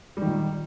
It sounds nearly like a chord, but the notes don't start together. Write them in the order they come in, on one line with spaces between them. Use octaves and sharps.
G3 D#3 A#2